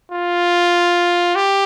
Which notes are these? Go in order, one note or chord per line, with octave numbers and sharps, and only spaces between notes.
F4
G4